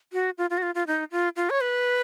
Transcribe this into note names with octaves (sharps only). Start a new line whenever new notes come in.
F#4
F4
F4
F#4
F4
F4
D#4
F4
F4
C#5
B4